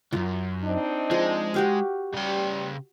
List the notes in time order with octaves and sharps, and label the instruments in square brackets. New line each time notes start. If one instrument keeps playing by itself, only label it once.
[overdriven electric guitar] C#2 F#2 [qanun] F4
[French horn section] C4 D4 D#4
[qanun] F3 [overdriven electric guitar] G#3
[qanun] F#4 G4 F5
[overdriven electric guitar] C#3 G5 [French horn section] G3